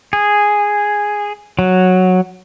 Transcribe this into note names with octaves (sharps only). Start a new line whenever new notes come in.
G#4
F#3